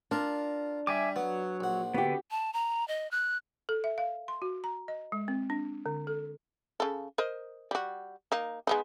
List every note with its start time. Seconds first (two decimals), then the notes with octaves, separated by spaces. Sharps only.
0.11 D4 F4 A#4
0.87 G3 E5 G#5 D6
1.16 F#3 B3
1.60 A#1 F#5
1.94 D3 B3 F#4 G4
2.31 A5
2.53 A#5
2.88 D#5
3.11 F#6
3.69 A4
3.84 E5
3.98 F5
4.28 C6
4.42 F#4
4.64 A#5
4.88 D#5
5.12 G#3
5.28 C4
5.50 D4
5.86 D3
6.07 A4
6.80 C#3 A4
7.18 A#4 C5 D#5
7.71 G3 F#4
8.32 A#3 D#4
8.67 G#3 B3 D#4